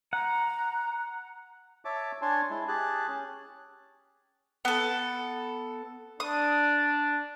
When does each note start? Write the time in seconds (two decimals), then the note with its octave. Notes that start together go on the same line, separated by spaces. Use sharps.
0.13 F#5 A#5
1.85 C#5 E5 A5 D6
2.22 D4 C#5 G#5 A5 C6
2.50 G#3 E4
2.68 G4 G#4 A5 F#6
3.08 C#4
4.65 B3 A4
6.20 D4 D#6